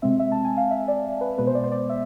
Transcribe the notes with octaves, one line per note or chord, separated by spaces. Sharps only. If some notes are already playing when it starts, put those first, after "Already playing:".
C3 G#3 C4 E5
E5
A5
G#5
F5
E5
D5
B4
B2 G#3 B3 B4
C5
D5
C5
D5
E5